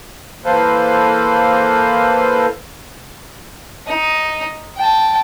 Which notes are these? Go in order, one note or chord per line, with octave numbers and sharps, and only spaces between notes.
E3 A#3 A4 B4 C5 F5
D#4
G5 A5